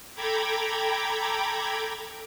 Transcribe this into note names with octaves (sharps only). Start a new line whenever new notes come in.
A4 G5 A#5 B5 D6 G#6